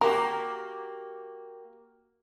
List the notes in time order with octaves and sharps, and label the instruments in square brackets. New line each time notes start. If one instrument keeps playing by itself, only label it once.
[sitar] A#3 F#4 G4 [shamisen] A#4